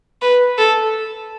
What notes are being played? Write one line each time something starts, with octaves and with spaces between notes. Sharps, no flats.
B4
A4